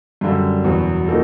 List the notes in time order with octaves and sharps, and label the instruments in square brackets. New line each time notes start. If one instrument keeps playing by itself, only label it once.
[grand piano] F#2 D3 G3
E2 B2 F#3
F3 A#3 D#4 F#4 A4